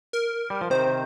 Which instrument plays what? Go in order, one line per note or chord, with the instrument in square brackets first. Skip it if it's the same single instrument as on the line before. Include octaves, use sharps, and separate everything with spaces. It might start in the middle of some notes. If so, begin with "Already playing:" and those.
[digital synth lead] A#4
[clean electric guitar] G3
F3
[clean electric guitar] C3 D#3 [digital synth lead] C5